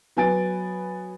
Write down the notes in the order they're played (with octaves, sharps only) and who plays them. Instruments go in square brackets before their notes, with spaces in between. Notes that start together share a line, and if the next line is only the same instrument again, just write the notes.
[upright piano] F#3 B3 G#5 A6 D7